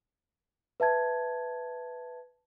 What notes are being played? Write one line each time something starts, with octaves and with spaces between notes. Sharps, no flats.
B4 E5 A5 G#6